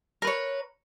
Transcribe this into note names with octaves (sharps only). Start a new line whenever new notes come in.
A#4 B4 C#5